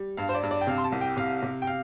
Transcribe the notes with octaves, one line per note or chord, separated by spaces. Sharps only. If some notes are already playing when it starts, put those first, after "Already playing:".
Already playing: G3
G2 F5
C5
D5
G2
D5
G5
C3 F5
C6
A5
C2
G5
C3 F5
C3
G5
F5